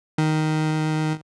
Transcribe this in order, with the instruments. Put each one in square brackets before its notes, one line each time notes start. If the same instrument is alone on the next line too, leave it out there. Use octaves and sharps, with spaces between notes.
[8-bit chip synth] D#3